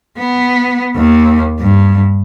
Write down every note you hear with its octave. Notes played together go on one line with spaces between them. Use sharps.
B3
D#2
G2